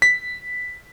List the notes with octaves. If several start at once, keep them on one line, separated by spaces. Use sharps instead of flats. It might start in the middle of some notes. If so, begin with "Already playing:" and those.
B6